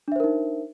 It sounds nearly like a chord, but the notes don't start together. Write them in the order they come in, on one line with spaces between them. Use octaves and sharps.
D4 E5 C5 A#4 D#4